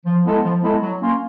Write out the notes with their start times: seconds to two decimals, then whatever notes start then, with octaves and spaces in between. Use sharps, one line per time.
0.05 F3
0.25 G#3 B3 E4 A4
0.43 F3
0.63 G#3 B3 E4 A4
0.81 F#3
1.01 A#3 C#4 F4